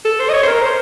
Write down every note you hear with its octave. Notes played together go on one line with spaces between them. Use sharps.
A4
C5
D#5
C#5
C5
A#4
C5